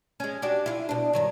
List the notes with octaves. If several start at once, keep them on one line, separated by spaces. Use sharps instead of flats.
G#3 C#4
D4 F#4 G4
E4 F4
B2 D4
G2 D#3 F#3